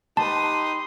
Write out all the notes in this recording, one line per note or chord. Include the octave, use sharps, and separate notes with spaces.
D#4 G4 B4 A5 C6 D#6